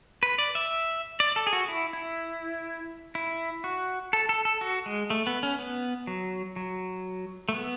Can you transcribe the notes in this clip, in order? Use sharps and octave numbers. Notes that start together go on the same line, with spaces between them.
B4
D5
E5
D5
A4
G#4
F#4
E4
E4
E4
F#4
A4
A4
A4
F#4
G#3
A3
B3
C#4
B3
F#3
F#3
A3
B3